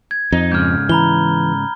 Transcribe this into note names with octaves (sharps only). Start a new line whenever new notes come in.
G#6
F2 D#4
G#2 C#3 F6 G6
E3 A#5 B5 G7